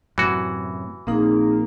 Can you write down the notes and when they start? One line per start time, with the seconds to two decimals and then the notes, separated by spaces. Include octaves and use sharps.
0.18 F#2 A2 C3 E3 F#4
1.07 A#1 A#3 C4 D#4 G#4